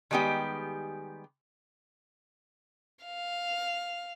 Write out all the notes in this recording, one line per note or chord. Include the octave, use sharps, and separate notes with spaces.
D#3 G3 G#3 B3 G4
F5